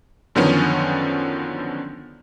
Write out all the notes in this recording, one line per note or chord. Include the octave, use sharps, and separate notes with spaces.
F#2 D3 D#3 F3 B3 C#4